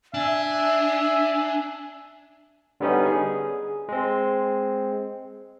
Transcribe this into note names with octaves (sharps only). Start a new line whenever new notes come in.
D4 E5 G#5
D3 G3 B3 C#4 D#4
G#4
G#3 C4